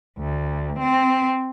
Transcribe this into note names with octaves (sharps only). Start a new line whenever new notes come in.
D2
C4